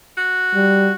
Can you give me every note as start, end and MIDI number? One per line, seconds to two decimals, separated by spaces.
0.17 0.94 66
0.54 0.91 55